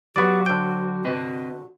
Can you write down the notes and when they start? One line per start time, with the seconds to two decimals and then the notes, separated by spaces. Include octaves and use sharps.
0.16 F#3 B3 F#4 G4 D5 C#6 D6
0.46 D3 C5 G5
1.04 C4 F#4 B4 D#5